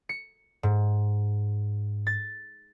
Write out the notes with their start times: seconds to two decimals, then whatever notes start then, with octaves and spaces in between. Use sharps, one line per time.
0.09 C#7
0.63 G#2
2.07 A6